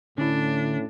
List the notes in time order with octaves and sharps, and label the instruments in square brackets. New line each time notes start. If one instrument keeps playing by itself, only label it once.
[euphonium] A2 [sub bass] D3 [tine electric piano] C#4 E4 [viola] D4